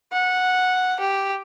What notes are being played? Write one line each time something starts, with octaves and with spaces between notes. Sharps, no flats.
F#5
G4